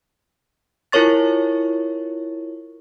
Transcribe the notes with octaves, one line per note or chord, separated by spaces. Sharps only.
E4 F4 A#4 C#5 C#6 A6